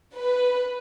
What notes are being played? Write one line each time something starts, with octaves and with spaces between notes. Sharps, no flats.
B4